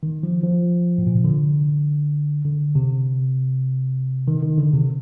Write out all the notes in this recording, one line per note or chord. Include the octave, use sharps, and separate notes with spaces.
D#3
F3
F3
A2
A#2
C3
D3
D3
C3
D#3
D#3
D3
C3